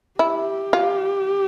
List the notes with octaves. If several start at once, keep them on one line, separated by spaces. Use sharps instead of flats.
E4 G4
F4